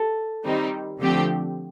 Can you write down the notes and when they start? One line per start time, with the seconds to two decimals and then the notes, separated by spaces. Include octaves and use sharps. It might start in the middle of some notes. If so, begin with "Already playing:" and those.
Already playing: A4
0.45 D#3 G3 C4 D#4
0.99 D3 F3 A3 C4 G4